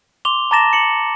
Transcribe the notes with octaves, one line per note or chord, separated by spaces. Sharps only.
C6 D6 F7 G7
A5 A#5 D6 A6 A#6 E7
C#7 F#7